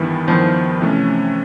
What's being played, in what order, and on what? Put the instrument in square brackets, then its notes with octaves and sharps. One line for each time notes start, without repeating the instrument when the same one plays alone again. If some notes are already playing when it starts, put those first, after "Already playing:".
Already playing: [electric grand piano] G2 D#3 G3 B3 E4 [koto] E3
[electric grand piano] G2 D#3 G3 B3 E4 [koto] F3
[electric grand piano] C3 E3 A3 C#4